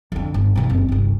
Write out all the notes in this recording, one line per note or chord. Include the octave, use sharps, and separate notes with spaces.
F2 D3
G1
D#2 B2
F#1 C4
G1 C2